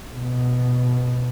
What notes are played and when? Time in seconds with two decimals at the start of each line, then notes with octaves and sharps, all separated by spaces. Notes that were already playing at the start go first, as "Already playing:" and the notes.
0.13 B2